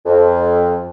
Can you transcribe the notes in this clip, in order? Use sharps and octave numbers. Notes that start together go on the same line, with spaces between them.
F2